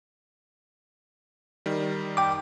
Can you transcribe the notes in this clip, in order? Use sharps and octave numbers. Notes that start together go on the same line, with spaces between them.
D#3 G3
G5 D6